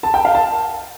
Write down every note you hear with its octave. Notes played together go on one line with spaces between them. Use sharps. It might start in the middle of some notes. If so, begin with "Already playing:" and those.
A5
G5
F5
A5